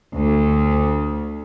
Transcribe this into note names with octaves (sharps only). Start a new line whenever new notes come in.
D2